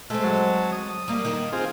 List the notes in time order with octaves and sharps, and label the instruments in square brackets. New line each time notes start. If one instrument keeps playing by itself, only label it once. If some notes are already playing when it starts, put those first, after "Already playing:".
[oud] G#3 C4 [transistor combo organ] A3
[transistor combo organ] F#3 A5
D#6
[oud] G3 A#3
D#3
[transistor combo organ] C4 F4 G#4